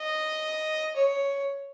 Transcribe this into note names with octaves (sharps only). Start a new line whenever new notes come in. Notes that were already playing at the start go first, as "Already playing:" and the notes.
Already playing: D#5
C#5